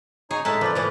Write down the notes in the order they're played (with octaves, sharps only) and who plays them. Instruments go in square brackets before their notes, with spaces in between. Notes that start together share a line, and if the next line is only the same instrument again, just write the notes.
[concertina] D#4 C#5 [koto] G#4
[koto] A2 G#3 A5 [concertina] D#4 E5
[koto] A#2 F3 [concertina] B4 D5
[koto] A2 E3 F3